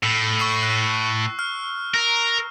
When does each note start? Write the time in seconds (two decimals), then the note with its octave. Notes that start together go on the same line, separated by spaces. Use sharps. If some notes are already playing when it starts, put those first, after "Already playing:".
0.03 A2 E6
0.39 C#6 E6 C7
0.63 F#6
1.39 F6
1.94 A#4